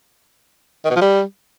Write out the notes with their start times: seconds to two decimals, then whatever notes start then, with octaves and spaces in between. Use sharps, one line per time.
0.85 D#3
0.90 B2
0.96 F3
1.01 G3